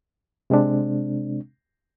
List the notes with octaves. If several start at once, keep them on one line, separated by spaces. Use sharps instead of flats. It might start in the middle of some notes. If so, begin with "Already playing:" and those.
C3 G#3 C4 D4